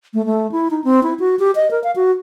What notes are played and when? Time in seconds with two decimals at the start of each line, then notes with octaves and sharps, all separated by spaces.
0.14 A3
0.26 A3
0.52 E4
0.71 D#4
0.84 C4
1.03 E4
1.20 F#4
1.39 G4
1.55 D#5
1.71 A#4
1.84 F5
1.96 F#4